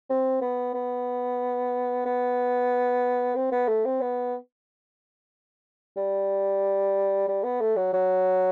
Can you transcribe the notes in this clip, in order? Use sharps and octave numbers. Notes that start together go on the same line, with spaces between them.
C4
B3
B3
B3
C4
B3
A3
C4
B3
G3
G3
B3
A3
F#3
F#3